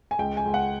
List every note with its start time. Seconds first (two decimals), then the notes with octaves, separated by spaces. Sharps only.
0.11 G#5
0.19 C#2 G5
0.37 G#5
0.45 C#2
0.54 F#5